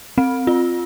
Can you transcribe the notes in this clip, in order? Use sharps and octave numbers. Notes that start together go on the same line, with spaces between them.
C4
F4